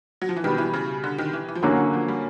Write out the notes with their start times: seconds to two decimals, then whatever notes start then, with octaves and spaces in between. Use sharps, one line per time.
0.22 F#3
0.29 F3
0.36 E3
0.44 B2 D#3 G3 B3
0.58 E3
0.73 C#3
1.04 D3
1.18 D#3
1.33 E3
1.48 E3
1.55 F3
1.62 D3 E3 F#3 A#3 C#4 F#4
1.93 F3
2.08 G3